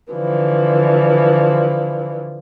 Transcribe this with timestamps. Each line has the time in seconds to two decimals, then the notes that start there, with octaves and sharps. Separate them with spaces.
0.12 D3 E3 F3